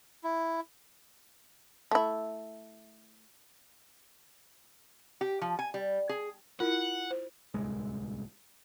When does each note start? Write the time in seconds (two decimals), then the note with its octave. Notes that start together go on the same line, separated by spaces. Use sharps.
0.24 E4
1.91 A3 E4
5.21 G4
5.41 F3
5.59 G#5
5.74 G3
6.09 G#4
6.60 E4 F4 A#4 F#5
7.10 C5
7.54 D1 C2 G#3